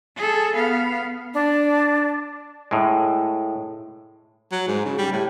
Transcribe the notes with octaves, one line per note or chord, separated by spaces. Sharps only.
G#4 A4
B3 F5
D4
A2 G#3
F#3
G#2
C#3
G3
A2